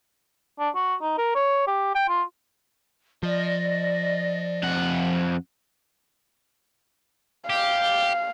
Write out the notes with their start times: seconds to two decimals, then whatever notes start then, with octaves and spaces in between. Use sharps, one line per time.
0.60 D4
0.76 F#4
1.02 D#4
1.18 A#4
1.35 C#5
1.67 G4
1.95 G5
2.09 F4
3.23 F3 D5 D#5
4.63 F2 F#5
7.50 G4 F5